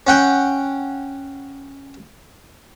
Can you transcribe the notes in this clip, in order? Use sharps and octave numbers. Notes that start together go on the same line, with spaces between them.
C#4 F#5 G5